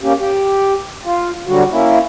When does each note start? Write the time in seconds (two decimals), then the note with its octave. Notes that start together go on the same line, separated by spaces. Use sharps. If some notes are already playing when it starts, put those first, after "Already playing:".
0.01 A#3 C#4 G4
0.18 G4
1.05 F4
1.47 D3 F#3 G3 F#4
1.72 A#3 C#4 E4